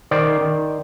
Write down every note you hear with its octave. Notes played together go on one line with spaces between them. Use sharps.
D#3 C5 D5
D#3